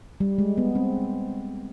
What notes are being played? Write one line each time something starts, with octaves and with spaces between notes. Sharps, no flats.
G3
G#3
B3
C4